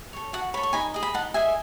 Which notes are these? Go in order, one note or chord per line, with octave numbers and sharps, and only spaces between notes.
A4 C#5
F#4 F#5 A5
A4 C#5 B5
C#6
D#4 G#5 B5
G#4 D#5
B5
D#4 F#5 A5
G#4 D#5 E5 G#5